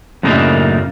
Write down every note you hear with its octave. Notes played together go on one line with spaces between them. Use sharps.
F#2 A2 C#3 A#3 D4 D#4